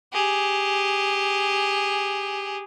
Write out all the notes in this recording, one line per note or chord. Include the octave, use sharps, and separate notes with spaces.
G4 G#4